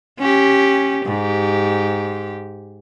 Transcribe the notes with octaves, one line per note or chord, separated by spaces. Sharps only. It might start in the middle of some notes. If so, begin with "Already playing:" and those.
C#4 G4
G#2 G4